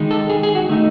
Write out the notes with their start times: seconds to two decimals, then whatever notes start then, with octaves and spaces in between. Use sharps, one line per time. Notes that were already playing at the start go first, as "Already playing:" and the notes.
Already playing: D#3 G#3 D#4
0.11 A4
0.30 G#4
0.43 G#4
0.55 F#4
0.69 D#3 A3 D#4